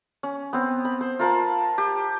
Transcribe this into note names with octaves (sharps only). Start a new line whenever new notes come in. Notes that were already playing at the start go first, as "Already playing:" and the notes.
C#4
B3 C4
B5
C5
F4 A#4 A5 B5
G4